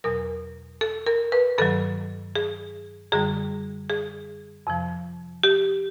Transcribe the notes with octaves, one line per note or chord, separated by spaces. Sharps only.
E2 B2 F#3 A#4
A4
A#4
B4
G2 D#3 F#3 A4
G#4
F#2 D3 G3 G#4
G#4
F2 C3 F3
G4